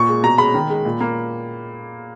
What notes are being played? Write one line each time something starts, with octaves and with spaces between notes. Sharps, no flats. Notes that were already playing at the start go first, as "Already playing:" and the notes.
Already playing: A#2 C#6
G#3
B2 A#5
G#3 B5
D#3
G#3
A#2
A#3